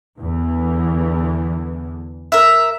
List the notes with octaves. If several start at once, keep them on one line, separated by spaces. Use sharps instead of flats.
E2 D3 E3
A#4 E5